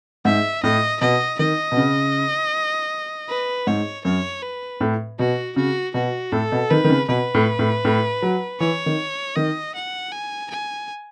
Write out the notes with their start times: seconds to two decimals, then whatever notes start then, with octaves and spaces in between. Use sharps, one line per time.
0.25 G#2 E5
0.63 A2 D#5
1.01 B2 D#5
1.39 D#3 D#5
1.72 B2
1.77 C#3
3.29 B4
3.67 G#2 C#5
4.05 F#2 C#5
4.43 B4
4.81 A2
5.19 B2 F#4
5.56 C#3 F#4
5.94 B2 F#4
6.32 A2 A4
6.52 B2
6.70 D#3 B4
6.84 D#3
6.90 C#3
7.08 B2 B4
7.34 A2
7.59 A2
7.85 A2
8.22 F#3
8.60 E3 C#5
8.86 D#3
9.36 D#3 D#5
9.75 F#5
10.12 G#5
10.50 G#5